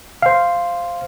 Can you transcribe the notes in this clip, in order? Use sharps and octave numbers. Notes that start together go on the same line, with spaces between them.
C5 F5